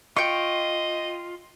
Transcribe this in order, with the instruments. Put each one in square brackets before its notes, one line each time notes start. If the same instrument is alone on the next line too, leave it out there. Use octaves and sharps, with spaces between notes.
[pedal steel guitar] F4 [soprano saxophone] D#5 [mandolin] G5 C#6